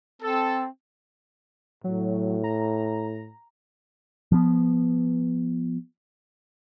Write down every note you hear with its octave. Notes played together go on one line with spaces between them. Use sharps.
C4 A4
A2 F#3
A#5
F3 B3